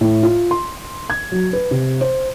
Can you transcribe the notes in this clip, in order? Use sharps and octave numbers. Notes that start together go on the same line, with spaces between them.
A2
F4
C6
G#6
F#3
B4
C3
C5